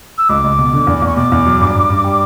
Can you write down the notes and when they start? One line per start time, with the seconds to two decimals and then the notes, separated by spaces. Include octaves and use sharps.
0.18 E6
0.29 C#2 D6
0.44 C#2
0.58 B2
0.73 D3
0.87 E2
1.02 E2
1.07 C#6
1.16 B2 D6
1.32 E2
1.46 F#3
1.60 G2
1.75 G2
1.89 G2
2.04 G3